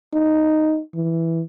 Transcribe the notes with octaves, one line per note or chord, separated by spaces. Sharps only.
D#4
E3